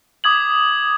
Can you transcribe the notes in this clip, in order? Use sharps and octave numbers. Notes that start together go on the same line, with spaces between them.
D6 D#6 G#6 F#7